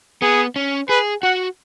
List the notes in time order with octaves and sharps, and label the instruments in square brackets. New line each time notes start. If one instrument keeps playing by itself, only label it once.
[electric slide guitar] B3 [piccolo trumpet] G#4
[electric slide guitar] C#4
[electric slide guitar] G#4 [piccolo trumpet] B4
[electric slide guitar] F#4 [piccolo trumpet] F#5